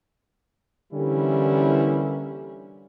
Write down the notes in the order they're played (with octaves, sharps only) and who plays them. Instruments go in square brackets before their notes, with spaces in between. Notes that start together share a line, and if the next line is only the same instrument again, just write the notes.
[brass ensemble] D3 E3 G3 A#3 C#4 E4